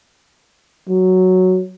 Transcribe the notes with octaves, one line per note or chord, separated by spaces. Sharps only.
F#3